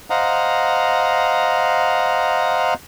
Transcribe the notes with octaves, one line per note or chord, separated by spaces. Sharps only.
C5 D#5 F5 F#5 A#5